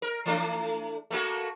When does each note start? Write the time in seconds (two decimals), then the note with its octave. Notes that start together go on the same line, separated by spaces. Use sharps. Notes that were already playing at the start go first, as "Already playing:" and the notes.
0.02 A#4
0.26 E3 A3 D4
1.11 A3 A#3 F#4